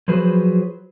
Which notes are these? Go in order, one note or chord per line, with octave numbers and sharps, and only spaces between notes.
F3 F#3 G#4 B4 C5